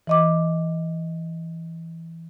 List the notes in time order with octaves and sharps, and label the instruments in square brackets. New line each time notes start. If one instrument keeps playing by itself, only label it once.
[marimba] E3 D#5 D6